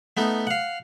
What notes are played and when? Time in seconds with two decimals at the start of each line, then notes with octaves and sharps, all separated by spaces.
0.17 A3 B3 D#4
0.47 F5 F#5